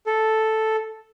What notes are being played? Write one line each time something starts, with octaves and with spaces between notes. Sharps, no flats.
A4